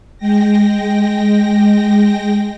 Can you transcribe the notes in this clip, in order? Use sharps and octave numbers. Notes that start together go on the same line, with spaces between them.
G#3 G5 A#6